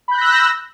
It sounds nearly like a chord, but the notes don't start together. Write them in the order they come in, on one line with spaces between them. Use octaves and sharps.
B5 G6 F#6 A#6 E6